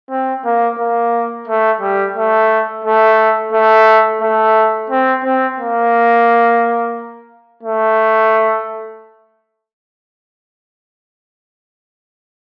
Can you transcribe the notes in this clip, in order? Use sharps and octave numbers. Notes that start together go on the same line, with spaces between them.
C4
A#3
A#3
A3
G3
A3
A3
A3
A3
C4
C4
A#3
A3